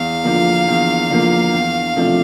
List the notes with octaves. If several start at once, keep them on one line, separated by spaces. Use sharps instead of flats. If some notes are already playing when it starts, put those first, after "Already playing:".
Already playing: E2 F5
D3 F3 A#3
E2
D3 F3 A#3
E2
C3 F3 A3 D4